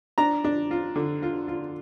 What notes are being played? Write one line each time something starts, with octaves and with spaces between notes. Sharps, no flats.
D4 A#5
D4
F4
D3
F4
F4